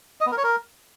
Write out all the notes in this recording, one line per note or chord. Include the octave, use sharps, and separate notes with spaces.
D#5
B3
A#4
C#5
A#4